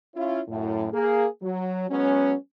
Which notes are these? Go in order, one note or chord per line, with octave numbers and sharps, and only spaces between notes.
C#4 E4 F4
F#2 A2
A#3 G#4
F#3
F#3 G#3 B3 C#4